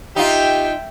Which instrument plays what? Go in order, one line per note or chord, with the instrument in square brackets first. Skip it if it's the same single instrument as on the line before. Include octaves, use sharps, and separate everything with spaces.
[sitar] D#4 F4 [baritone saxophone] G4 [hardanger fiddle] E5 G5